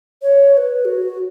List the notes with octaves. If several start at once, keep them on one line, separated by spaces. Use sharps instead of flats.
C#5
C#5
B4
F#4